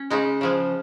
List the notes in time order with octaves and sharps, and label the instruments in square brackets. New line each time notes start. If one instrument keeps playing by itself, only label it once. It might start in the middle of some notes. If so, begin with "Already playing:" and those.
Already playing: [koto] C#4
C#3 G#3 D#4
C#3 F3 G#3